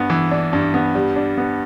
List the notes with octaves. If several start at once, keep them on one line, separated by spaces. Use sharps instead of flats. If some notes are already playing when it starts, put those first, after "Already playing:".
Already playing: G2 B3
E3
D4
G2
B3
G3
D4
B3